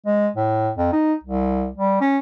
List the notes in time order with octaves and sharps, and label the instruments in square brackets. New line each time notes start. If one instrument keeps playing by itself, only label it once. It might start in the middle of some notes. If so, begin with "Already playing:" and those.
[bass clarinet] G#3
A2
F2
D#4
C2
G3
C#4